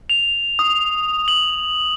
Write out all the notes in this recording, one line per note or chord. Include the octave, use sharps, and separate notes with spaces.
F7
D#6
F#7